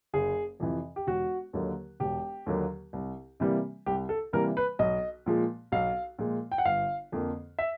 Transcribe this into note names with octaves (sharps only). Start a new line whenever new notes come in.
F#1 G#4
F2 C3 E3
G4
E1 F#4
D#2 D3 F#3 A#3
E1 G4
D#2 D3 F#3 A#3
C2
C3 E3 G3 A#3
C2 G4
A4
C3 E3 G3 A#3 A#4
B4
B1 D#5
A#2 F3 G#3
B1 F5
A#2 F3 G#3
G5
F#5
G1 F5
F2 D3 F3 A#3
E5